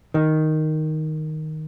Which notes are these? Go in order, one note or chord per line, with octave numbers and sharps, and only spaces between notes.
D#3